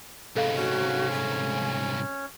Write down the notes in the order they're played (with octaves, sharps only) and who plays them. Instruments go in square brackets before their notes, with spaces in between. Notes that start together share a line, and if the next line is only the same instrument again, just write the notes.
[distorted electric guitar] C2 G#2 [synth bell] A4 F5
[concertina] C#4 [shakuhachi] F#4
[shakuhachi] G#5